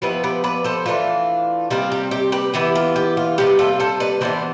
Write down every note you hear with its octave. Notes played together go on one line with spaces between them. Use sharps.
F3 B3 E4 G4 B4
G4 B4
B4 D5
A4 C5
E3 A3 D4 F4
C3 G3 C4 F4
G4
G4
G4 B4
E3 B3 E4 G4
F4
G4
F4
C3 G3 B3 G4
F4 A4
A4 C5
B4 D5
E3 B3 D4 C5 E5